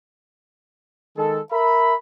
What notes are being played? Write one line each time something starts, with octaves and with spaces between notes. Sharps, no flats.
D#3 G#3 A4
A#4 E5 B5